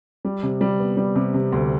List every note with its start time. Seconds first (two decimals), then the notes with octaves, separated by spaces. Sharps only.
0.25 G3
0.43 C3
0.61 G3
0.80 B3
0.97 G3
1.16 C3
1.34 C3
1.52 D2